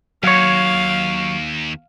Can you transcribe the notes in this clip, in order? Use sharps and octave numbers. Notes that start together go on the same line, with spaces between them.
D#2 F#3 C#5 F5